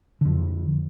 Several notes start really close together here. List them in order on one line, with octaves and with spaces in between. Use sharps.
D3 F2 F3